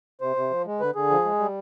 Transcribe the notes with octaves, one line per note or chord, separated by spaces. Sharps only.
C3 C5
C3
F3
G#3
D3 B4
D3 G#4
F3
G#3
G3